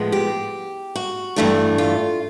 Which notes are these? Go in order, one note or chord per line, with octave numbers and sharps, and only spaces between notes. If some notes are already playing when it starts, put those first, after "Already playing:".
Already playing: A2 F3 G#3 B3
G4
F#4
G2 E3 A3 D4
F4